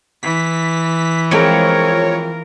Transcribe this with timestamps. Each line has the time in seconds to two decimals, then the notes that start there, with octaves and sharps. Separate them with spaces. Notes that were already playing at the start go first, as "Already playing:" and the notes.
0.23 E3 B6
1.31 F3 G#3 C4 F4 A#4 C#5